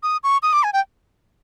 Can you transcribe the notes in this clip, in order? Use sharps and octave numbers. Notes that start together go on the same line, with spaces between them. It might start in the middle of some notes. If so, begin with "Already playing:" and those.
D#6
C#6
D#6
D6
G#5
G5